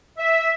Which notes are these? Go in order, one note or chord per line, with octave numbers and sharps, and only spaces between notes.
E5